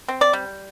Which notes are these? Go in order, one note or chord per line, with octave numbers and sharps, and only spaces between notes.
C4
D5
G3